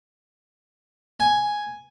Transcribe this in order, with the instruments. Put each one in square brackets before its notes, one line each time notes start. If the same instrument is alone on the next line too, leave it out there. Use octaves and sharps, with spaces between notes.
[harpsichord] G#5